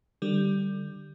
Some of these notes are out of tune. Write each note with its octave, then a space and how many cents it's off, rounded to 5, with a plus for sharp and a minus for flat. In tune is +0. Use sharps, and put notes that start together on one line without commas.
D3 +25 G3 +0